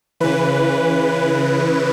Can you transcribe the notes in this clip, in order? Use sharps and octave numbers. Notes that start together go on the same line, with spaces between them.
C#3 E3 B4